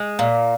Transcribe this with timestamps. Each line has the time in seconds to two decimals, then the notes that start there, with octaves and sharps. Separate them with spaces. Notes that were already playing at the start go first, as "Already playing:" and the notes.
Already playing: G#3
0.19 A#2